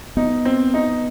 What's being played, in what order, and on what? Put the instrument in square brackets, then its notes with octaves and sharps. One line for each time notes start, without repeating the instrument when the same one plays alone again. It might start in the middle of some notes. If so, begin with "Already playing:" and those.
[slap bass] B3 [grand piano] D#4
[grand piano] C4
D#4